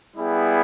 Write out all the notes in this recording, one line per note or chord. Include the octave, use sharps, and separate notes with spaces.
G3 B3 E4 G#4